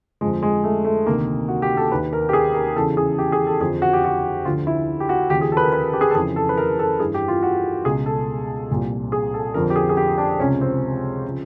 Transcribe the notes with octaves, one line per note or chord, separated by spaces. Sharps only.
F2 D3 F3 G#3
G#3
A3
A3
D2 C3 D#3 A#3
F#4
G4
A4
D#2 D#3 B4
A#4
G4
G#4
A#4
E2 C#3 E3 A4
G#4
G4
G#4
A4
F2 D3 F3 G#4
F#4
G4
F#4
D2 D3 F3 F4
E4
G4
F#4
D#2 C#3 F3 G4
G#4
A4
B4
A#4
B4
G4
G#4
A4
F2 C#3 E3 G#4
A4
B4
A#4
A4
G2 E3 G#4
G4
F4
F#4
C#2 B2 G#4
A4
C2 A#2 F3
G#4
A4
F2 D3 F3 A#4
G4
G#4
G#4
G4
D4
C#2 C3 F3 C#4
C4
C#3 F3